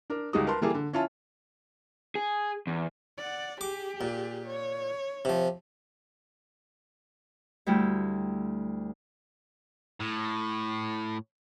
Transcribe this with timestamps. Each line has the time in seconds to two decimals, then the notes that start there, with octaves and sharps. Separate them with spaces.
0.10 D4 A#4
0.33 C#2 G3 G#3 D#4 F#4 D#6
0.47 A#4 B4 A5 C6
0.61 E3 G3 A#3 G#4 A4
0.75 D3
0.93 C#4 E4 F4 G#5 A5
2.15 G#4
2.67 E2
3.18 D5 F#5
3.61 G4 G#4 D6
4.01 A#2
4.46 C#5
5.25 C3 F3
7.66 D2 G3 A3 E4 G5
10.01 A2